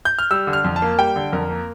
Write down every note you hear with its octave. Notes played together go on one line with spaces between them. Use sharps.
G6
F6
G3 E6
D3
F6
F2
A5
A#3
G3 G5
D3
F2 A#4
A#3